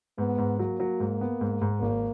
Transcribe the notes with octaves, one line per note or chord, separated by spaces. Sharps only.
G#2 B3
G#2
F#3 A#3
F#3
G#2
B3
G#2
G#2
G#1 A#3